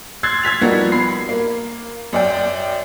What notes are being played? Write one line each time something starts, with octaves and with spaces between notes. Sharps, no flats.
C6 E6 F#6 G#6 A6 C7
E6 G#6 B6 F7
F3 G3 A#3 B3 D#4 F#4
B5 C7
A#3
F#2 D5 G5